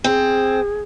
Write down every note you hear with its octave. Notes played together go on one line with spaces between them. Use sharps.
C4 G#4